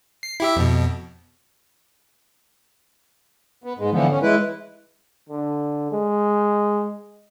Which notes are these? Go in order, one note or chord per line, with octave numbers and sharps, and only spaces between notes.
C7
E4 G4 E5
F2 B2
B3
G#2 G#3
D3 E3 F3 B3
C#4
E3 G#3 E4 B4
D3
G#3